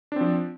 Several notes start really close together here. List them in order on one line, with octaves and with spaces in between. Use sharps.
D4 C4 F3